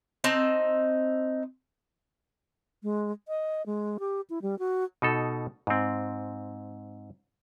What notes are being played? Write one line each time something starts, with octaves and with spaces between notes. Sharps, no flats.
C4 D#4 A5
G#3
D#5
G#3
G4
E4
G3
F#4
B2 D#4 A4
G#2 C4